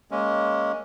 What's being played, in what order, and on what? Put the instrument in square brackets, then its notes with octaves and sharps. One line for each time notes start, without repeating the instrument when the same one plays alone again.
[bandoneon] G#3 A#3 C#4